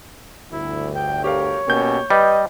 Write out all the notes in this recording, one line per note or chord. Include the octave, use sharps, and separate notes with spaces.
G1 D2 E4
G5
G4 A#4 C#5 F5
B2 A#3 C#4 G4 G6
G3 B4 D#5